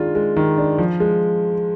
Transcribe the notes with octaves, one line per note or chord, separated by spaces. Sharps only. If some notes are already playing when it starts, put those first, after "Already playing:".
Already playing: D#3 G#3 D4 F4
G#3
D#3
D4
F3
G#3